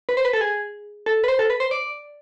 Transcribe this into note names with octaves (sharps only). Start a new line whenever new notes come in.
B4
C5
B4
A4
G#4
A4
B4
C5
A4
B4
C5
D5